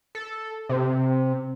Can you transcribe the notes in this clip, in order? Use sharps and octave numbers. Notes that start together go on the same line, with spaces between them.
A4
C3